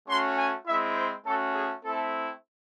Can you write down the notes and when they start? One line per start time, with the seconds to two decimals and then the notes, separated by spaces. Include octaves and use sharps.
0.08 A3 C#4 F#4 C6
0.38 G#5
0.67 G#3 C4 E4 E5
0.96 C5
1.26 A3 C#4 F#4 A4
1.55 G#4
1.85 A3 C4 E4 A4